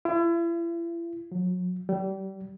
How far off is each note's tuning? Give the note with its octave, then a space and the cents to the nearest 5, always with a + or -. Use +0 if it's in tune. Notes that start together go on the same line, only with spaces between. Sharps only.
E4 +40
F#3 -35
G3 -30